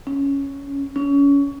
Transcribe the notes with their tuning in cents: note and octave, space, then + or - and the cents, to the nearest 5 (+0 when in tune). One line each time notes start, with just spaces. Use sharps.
C#4 +5
C#4 +25